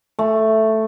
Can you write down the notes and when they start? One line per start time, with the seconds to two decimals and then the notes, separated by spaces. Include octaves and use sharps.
0.19 A3